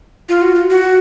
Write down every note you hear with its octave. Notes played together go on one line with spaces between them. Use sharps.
F4
F#4
F4
F#4